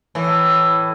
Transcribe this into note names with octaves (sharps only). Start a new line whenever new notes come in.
A2 E3